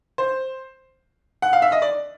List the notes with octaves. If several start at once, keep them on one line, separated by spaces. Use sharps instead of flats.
C5
F#5
F5
E5
D#5
D5